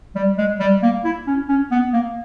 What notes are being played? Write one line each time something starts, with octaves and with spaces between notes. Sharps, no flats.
G3
G#3
G3
A#3
E4
C#4
C#4
B3
A#3